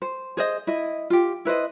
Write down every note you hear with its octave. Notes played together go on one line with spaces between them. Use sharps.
C5
G#4 C5 D#5
E4 D#5
F4 G4
E4 B4 C5 D#5